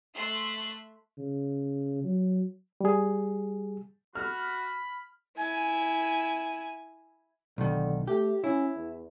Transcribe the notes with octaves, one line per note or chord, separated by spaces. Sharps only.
A3 E5 C6 F#6 C7
C#3
F#3
G3 G#4
F#4 B5 F6
E4 G#5
B1 D3 D#3
A3 G4
C#4 E4
E2